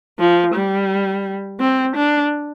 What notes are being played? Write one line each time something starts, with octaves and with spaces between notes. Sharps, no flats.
F3
G3
C4
D4